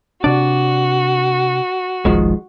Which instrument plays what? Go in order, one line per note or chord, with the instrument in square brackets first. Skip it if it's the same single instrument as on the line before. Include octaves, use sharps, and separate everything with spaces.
[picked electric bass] C3 D4 [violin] F#4 [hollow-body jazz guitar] D5
[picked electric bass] F1 B1 [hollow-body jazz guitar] D#3 F3 G#3